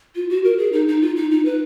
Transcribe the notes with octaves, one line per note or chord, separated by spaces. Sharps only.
F4
F#4
A#4
G#4
D#4
D#4
F4
D#4
D#4
B4